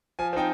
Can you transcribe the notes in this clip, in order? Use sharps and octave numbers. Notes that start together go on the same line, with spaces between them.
F3 G#5
C4 D#4 G5